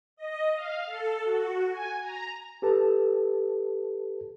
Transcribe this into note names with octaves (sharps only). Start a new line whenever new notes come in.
D#5
F5
A4
F#4
G#5
A#5
G4 A4 B4 A5